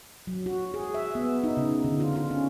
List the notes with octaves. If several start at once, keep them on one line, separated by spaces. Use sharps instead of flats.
F#3
F#4
G#4
E5
B3
D#4
C#3
D3
F4
F4
C#4